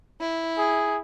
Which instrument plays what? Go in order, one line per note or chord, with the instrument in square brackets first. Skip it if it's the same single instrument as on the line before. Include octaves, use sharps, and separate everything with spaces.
[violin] E4
[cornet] G#4